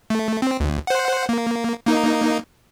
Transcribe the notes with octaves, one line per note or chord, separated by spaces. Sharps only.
A3
C4
D2
C5 F#5
A#3
A#3 D#4